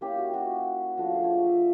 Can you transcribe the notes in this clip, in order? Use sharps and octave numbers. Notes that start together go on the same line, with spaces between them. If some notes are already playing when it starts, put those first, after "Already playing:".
A#3 C#4 E4 G4
F#4
F#4
F3 A3 D4 F4 F#4
G#4
C#5
D5
E5